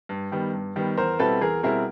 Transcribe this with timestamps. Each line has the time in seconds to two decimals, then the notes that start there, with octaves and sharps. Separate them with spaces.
0.09 G2
0.32 D#3 G3 B3
0.53 G2
0.76 D#3 G3 B3
0.97 E2 A#4 C5
1.19 B2 G3 C4 E4 A4 B4
1.41 E2 G#4 A#4
1.63 B2 G3 C4 E4 G#4 A#4